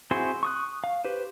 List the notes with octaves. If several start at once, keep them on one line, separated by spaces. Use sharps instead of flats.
C4 E4 F#4 G#4 C5
C#6 D#6 F#6
F5
G4 B4 C5